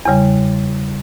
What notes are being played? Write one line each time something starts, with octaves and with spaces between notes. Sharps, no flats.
E2 C#3 G3